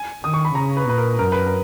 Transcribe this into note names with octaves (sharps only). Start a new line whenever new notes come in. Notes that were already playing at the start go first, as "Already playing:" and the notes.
Already playing: G#5
D#3 D#6
C#6
B5
C#3 A#5
B4
A#2 B4
A#4
F#2 A#4
B4
A#4